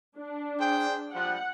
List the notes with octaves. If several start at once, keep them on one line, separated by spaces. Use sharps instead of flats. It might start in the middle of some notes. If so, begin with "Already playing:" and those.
D4
G#4 C5 G5
F3 G3 F#5